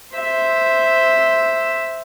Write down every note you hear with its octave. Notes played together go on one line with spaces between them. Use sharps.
C5 E5